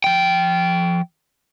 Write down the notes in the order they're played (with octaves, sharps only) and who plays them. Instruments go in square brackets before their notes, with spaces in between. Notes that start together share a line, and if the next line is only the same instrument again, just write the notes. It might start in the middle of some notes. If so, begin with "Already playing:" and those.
[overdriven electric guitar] F3 G5